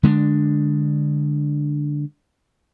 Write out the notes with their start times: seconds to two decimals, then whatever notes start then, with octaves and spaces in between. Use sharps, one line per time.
0.03 D3 G#3 B3 D4